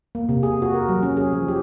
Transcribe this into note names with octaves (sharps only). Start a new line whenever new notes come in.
A#3
C3
G#4
F#4
A#4
F#3
C#4
G#4
F3
G4